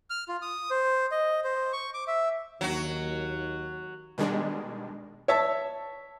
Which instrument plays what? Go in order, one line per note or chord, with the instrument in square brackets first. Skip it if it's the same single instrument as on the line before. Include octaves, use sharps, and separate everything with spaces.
[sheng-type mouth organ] F6
F4
D#6
C5
D#5
C5
C#6
D6
E5
[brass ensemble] D#2 [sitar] F#3 F#4
[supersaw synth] B2 D#3 G3 G#3 D4
[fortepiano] C#5 E5 A5